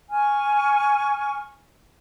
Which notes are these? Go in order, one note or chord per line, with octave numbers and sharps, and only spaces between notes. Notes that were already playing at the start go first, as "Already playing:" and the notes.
G#5 C#6 F6